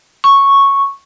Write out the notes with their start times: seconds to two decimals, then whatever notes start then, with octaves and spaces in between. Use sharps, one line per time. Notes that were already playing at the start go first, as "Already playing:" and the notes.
0.24 C#6